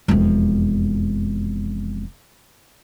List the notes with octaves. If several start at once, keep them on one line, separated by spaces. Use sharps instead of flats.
E1 F2